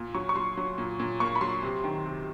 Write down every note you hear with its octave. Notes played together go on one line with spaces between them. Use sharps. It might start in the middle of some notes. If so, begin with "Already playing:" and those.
Already playing: A#2
F#3 C#6
C#6
F#3 C6
F#3
A#2
A#2
A#3 C#6
B5
F#3 C6
C3
D#3
C3